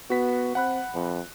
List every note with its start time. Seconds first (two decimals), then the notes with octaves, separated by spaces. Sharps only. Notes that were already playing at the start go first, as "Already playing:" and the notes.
0.10 B3 F#4 B6
0.55 C4 F#5 B5 F#6
0.94 F2